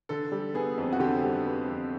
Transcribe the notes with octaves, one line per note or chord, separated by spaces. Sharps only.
D3 A4
G3
B3 G#4
F2
F#4
D3 G4
G3
B3
F2